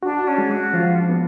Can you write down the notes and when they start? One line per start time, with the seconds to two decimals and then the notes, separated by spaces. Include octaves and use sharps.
0.02 D4 F#4
0.27 C#4
0.38 G#3
0.50 F#4
0.73 F3 F4
0.97 D4
1.09 B3